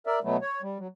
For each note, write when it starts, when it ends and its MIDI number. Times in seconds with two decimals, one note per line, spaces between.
0.07 0.19 70
0.07 0.19 74
0.07 0.19 76
0.24 0.37 47
0.24 0.37 54
0.24 0.37 57
0.24 0.37 59
0.42 0.62 73
0.62 0.78 55
0.78 0.87 54